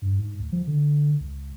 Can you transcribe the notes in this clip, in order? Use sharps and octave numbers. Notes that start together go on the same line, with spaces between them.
G2
G#2
D2
F3
D3
C#2